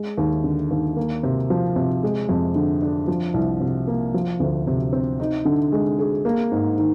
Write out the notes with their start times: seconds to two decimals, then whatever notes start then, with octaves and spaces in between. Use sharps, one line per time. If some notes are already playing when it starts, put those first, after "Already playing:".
Already playing: G#3
0.18 D#2
0.44 D3
0.71 D#2
0.96 A#3
1.23 C3
1.50 F3
1.76 C3
2.03 G#3
2.29 F2
2.56 D3
2.82 D4
3.08 F3
3.34 C2
3.60 C3
3.87 A#3
4.14 F3
4.40 D2
4.67 C3
4.93 C4
5.20 D#4
5.45 D3
5.72 G#3
5.99 G#4
6.25 A#3
6.52 G#2
6.78 D#3